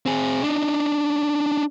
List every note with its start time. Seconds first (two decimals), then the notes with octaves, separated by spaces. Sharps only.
0.06 C4 G#4
0.43 D4 D#4